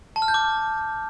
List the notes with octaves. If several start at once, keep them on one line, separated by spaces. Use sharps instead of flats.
A5
F6
G6
D6